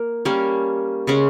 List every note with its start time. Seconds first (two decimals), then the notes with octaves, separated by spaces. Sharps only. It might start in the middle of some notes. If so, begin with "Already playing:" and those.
Already playing: A#3 A#4
0.25 G3 A#3 C#4
1.07 C#3 G#3 C#4